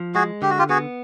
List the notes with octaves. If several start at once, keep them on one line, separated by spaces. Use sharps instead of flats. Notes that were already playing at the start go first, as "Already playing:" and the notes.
Already playing: F3
G#3 F#4 G#4
D3 G4
F#4
F4 G4
B3 F#4 G#4